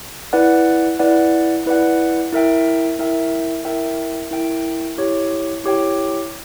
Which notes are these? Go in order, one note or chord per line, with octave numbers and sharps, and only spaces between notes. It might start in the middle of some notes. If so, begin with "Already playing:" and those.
E4 B4 D5 F#5
E4 B4 D5 F#5
E4 B4 D5 F#5
E4 A#4 E5 G5
E4 A#4 E5 G5
E4 A#4 E5 G5
E4 A#4 E5 G5
E4 G4 C#5 G5
E4 G4 C#5 G5